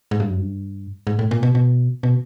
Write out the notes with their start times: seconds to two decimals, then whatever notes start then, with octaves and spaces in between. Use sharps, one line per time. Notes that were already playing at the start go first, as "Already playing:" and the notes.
0.11 G#2
0.20 G2
0.30 F#2
0.39 G2
1.07 G#2
1.19 A2
1.31 A#2
1.43 B2
1.55 B2
2.03 B2